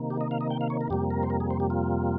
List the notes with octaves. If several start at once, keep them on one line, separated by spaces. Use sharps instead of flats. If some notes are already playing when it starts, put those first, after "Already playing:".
Already playing: C3 D#3 A#3
G4
D#5
F5
D#5
G5
F5
C#5
A#4
F2 C3 G3 A#3 G4
A#4
C5
A#4
G#4
C5
G4
F4